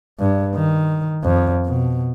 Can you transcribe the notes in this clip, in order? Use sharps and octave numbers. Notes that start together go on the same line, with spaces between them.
G2
D#3
F2
B2